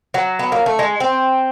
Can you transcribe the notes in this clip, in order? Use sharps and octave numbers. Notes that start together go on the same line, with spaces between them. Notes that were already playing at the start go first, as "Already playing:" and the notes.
F#3
B3
A#3
A3
G#3
C4